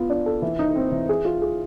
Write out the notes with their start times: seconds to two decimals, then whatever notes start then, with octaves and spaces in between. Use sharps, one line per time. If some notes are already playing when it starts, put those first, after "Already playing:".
Already playing: B3 F4
0.10 D4
0.26 A4
0.42 E3
0.59 D#4
0.76 C4
0.92 E3
1.09 G#4
1.25 F4
1.42 G#4